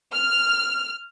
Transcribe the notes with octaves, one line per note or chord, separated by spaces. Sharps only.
F6